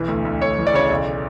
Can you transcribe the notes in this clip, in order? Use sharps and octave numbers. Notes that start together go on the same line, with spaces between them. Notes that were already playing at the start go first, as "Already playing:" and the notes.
Already playing: B1 E3
D2
D2
D2 C#5
E3
D5
C#3 C#5
D5
B1